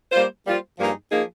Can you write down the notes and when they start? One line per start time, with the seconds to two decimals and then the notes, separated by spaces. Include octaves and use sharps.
0.12 G3 A#3 F4 C5
0.44 G3 A#3 F4 C5
0.78 G2 F3 A#3 D#4 G#4
1.11 F3 A#3 D#4 G#4